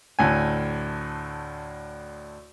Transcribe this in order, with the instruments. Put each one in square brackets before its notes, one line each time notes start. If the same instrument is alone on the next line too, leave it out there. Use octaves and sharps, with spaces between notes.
[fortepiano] D2 A2 G#5